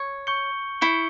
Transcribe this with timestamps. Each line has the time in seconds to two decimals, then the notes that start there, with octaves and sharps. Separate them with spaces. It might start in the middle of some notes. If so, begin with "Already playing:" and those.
Already playing: C#5
0.27 C#6 G6 C#7 G7
0.81 E4 C#6 G6 C#7 G7